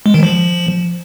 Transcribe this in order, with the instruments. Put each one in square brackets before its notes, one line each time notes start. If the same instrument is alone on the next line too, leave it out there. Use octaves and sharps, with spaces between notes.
[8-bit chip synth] G#3
D#3
F3